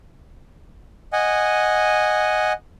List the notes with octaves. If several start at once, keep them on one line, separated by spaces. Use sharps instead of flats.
D#5 F#5 G#5